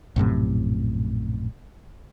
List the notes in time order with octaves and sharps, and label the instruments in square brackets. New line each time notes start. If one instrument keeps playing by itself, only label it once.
[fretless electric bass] A#1 F#2 A2 C3